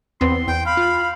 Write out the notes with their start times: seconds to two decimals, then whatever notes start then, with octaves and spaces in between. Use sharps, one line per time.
0.21 E2 B3 C4 C6
0.48 E2 G5
0.66 F5 B5
0.77 F4